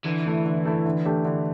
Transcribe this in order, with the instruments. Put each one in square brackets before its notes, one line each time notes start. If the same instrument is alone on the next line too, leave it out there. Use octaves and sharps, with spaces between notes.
[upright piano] D3 [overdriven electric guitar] E3
[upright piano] A3 E4
D3
A3 E4
D3
A3 D4 G4
D3